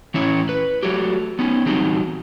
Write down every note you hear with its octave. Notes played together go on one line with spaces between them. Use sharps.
E3 C#4 E4 C#5
B4
F#3 A3 G4
B3 C#4 D#4
E3 F#3 G3 C4 D#4